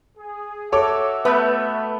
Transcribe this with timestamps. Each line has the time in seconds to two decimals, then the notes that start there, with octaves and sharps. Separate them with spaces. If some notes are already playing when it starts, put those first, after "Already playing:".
0.18 G#4
0.72 F#4 A4 C#5 E5 D6
1.25 A3 B3 B4